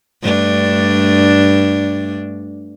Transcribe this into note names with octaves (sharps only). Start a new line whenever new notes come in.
G2 A3 D4